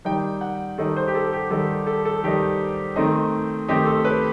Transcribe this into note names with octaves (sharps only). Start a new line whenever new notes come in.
D#3 G3 D#4 G5
F#5
D#3 G3 D#4 A4
C5
G4
A4
G4
D#3 G3 D#4 A4
A4
A4
D#3 G3 D#4 G4
D#3 A3 C4 D#4
D#3 A3 C4 D#4 G4
A4
B4